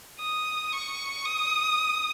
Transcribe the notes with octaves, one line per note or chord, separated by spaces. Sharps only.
D#6
C#6
D#6